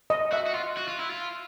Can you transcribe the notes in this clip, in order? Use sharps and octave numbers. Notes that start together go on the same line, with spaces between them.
D#5
F#4 E5
F#4
F4
F#4
F4
E4
F4